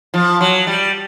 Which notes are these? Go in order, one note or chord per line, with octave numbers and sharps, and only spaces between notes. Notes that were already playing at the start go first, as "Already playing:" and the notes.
F3
F#3
G3